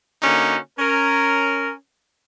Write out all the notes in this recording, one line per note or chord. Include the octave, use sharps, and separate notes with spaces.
D3 A#3 C#4 D#4 F#4
C#4 A#4